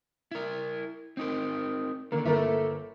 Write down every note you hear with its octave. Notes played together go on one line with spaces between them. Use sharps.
E4 A#4
C4 D#4 A#4
D3 D#3 A#3
G1 A#3 A4 A#4 E5